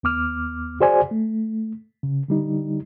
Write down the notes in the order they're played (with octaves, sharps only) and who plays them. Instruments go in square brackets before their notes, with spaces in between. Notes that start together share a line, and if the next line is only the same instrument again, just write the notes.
[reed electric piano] D#2 B3 D6 F6
F#4 G#4 C5 D5 G#5
A3
C#3
D3 G3 D#4